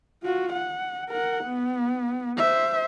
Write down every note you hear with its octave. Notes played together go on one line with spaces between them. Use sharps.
F4 F#4
F#5
A#4 F#5
B3
C5 E5